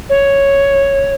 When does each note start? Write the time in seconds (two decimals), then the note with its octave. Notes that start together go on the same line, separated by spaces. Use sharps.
0.09 C#5